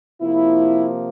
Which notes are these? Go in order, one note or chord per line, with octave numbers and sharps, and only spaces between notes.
C3 F3 A#3 E4